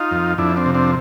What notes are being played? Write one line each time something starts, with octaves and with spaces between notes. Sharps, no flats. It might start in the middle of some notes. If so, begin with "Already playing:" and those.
Already playing: D#4 F4
F2
F2 D4 E4
C4 D4
C3
C4 D4